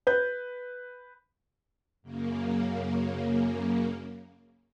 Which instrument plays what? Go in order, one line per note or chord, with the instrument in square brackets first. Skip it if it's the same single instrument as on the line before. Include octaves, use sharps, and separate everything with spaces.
[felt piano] B4 G6
[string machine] F#2 C#3 A#3